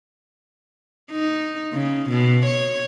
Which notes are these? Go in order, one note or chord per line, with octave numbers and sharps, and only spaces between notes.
D#4
C#3
B2
C#5